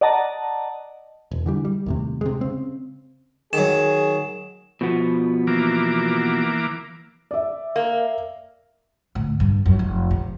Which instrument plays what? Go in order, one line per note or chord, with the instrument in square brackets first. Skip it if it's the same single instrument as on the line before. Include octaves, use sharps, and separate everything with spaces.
[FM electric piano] D5 D#5 F#5 A5 A#5
[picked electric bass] E1
D3 E3 G3
G3
D#2 A2 C3
C3 G#3
C#3 C4
[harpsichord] D#3 F#3 [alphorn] G#4 [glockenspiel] E7
[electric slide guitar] B2 F3 B3
[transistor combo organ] E3 A#3 D6
[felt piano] D5 E5
[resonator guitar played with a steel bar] A#3
[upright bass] D2 A2
G2
F#2
F1
C3